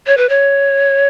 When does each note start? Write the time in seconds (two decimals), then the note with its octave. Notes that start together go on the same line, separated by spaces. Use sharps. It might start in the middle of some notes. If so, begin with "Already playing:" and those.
0.07 C#5
0.17 B4
0.29 C#5